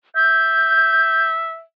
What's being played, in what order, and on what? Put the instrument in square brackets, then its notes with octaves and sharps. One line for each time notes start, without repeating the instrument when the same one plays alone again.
[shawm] E5 [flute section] G6